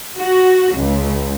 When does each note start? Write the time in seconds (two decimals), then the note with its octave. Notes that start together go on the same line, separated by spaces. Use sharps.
0.18 F#4
0.75 C#2